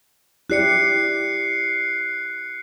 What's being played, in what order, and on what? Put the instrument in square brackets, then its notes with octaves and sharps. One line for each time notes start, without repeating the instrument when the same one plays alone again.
[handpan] E4 G4 D5 [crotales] F#6 C7 C#7